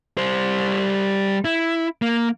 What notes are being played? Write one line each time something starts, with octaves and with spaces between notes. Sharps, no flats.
G3 C5
E4
A#3